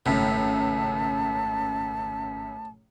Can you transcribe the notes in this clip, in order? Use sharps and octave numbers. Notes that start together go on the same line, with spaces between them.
G#1 C#2 F#2 A2 A5 B6